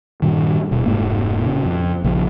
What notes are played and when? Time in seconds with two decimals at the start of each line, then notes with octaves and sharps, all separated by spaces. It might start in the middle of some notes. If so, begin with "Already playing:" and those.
0.22 G2 A#2 D#3
0.71 D#1 B2
0.85 F1 G#2 A#3
1.41 A#2 C#3
1.65 F2
2.04 A#1 C#3 F3